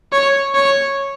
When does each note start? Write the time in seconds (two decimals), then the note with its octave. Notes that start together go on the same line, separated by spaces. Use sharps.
0.13 C#5
0.55 C#5